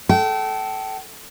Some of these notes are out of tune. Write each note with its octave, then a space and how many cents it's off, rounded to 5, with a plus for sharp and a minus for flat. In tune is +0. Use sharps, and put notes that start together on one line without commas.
A4 -15 G5 -35